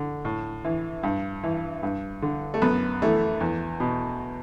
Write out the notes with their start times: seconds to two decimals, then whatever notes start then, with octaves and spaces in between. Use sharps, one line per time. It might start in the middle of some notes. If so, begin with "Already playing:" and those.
Already playing: D3
0.25 A2
0.64 E3
1.03 G2
1.43 E3
1.83 G2
2.22 D3
2.54 A3
2.62 F#2 B3
3.02 E3 A3
3.41 E2
3.80 B2